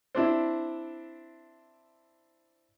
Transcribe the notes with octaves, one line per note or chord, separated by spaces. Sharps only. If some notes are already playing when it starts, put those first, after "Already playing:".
C4 D4 E4